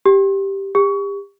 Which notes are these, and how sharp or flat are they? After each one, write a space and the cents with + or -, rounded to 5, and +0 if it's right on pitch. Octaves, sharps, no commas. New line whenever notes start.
G4 +0
G4 +30